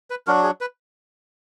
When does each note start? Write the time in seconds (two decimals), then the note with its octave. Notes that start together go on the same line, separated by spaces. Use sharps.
0.10 B4
0.27 F#3 D4 F#4 A#4
0.43 G#4
0.61 B4